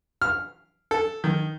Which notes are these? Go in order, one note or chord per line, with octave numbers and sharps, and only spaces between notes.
F6
A4
D#3